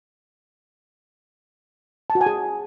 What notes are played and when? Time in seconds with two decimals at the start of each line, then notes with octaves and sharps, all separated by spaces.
2.10 A5
2.15 F#4
2.21 G#5
2.26 G#4